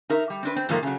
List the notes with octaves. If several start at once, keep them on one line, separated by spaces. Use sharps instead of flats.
D#4 A#4 E5
G3
C4 D4 B4
C4
G#2 C3 F3 A3 A#3
C#3 F#3